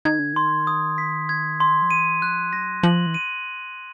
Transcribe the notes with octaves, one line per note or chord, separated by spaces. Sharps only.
D#3 G#6
D3
D#3 C6
D#6
B6
G#6
C6
F3
E3 D#7
F3 F#6
F#3 A#6
F3 F#7
E3
D#7